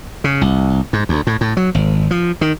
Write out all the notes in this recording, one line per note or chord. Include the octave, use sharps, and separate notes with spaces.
C#3
C2
G#2
D2
A2
A2
F#3
G#1
F3
D#3